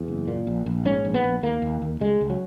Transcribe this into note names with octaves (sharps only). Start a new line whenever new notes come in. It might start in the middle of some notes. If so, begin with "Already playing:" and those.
Already playing: E2
F#1
A#2
A#1
A#1
G#2 C#4
A#1
B3
A#1
D#2 A#3
D#2
D#2
C#2 G#3
C#2
F#3